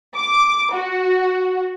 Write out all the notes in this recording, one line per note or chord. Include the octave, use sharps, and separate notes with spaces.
D6
F#4